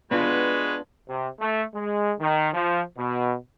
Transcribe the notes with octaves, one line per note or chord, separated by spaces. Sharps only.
G#3 B3 D4 F4 F#4 B4
C3
A3
G#3
D#3
F3
B2